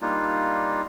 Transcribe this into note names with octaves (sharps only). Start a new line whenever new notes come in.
G3 A#3 D4 D#4 F4